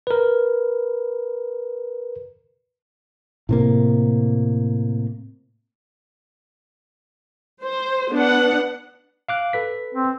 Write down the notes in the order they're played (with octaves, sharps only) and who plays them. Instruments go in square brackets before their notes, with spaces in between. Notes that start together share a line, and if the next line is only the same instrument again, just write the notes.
[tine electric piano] A#4 B4
[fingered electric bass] A2 C3 A#3
[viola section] C5
B3 D4 F#5
[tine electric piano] F5 D6 F#6
A4 B4 B6
[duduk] C4